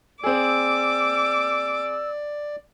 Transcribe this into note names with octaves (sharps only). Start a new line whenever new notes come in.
C4 G#4 D5 D6 E6